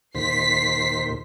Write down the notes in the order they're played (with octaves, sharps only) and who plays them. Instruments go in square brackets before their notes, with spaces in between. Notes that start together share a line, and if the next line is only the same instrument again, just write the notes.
[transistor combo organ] D#2 A#2 C5 [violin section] B6 C7